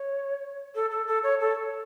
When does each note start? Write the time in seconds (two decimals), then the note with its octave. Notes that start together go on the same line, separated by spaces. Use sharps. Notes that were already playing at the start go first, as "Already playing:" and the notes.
Already playing: C#5
0.75 A4
0.91 A4
1.07 A4
1.23 C#5
1.40 A4